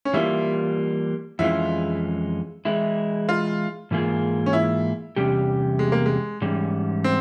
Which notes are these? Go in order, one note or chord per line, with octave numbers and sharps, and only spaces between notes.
C#4
E3 G3 A#3 E4 F4
F2 E3 G#3 C#4 E4 F4
E3 G#3 E4
F4
G#2 E3 A#3 F4 G#4
C#4
E4
E2 C3 G3 C#4 G4
G#3
A#3
G#3
G#2 E3 G3 C#4
C4